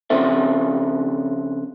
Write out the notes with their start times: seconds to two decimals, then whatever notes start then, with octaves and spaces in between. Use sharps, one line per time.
0.10 C#3 F3 C4 D4 A4 E5